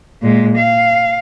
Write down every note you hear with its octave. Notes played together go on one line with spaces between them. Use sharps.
A#2 G#3
F5